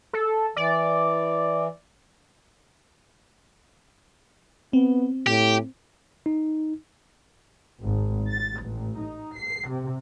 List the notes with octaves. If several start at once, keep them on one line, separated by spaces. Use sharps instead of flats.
A4
E3 D5
B3 C4
A2 G4
D#4
G#1
A6
A1
D#4
C7
C3